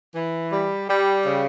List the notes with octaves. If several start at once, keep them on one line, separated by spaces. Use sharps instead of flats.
E3
G3
G3
C#3